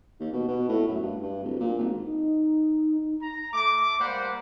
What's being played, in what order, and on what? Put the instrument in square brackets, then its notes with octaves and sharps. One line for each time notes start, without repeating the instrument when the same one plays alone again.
[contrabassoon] D#2
B2
B2
A2
F#2
G2
G2
D1
A#2
G#1
[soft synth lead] D#4
[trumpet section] A#5
A3 D6
G3 A#3 C5 F#5 B5